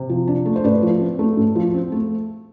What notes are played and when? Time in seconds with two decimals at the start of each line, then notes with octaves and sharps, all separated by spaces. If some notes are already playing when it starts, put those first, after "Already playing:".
Already playing: C3
0.09 F3
0.28 D4
0.46 A3
0.56 C5
0.64 A2 B4 D5
0.83 F3
1.00 C4
1.19 A3
1.37 A2
1.56 F3
1.74 C4
1.92 A3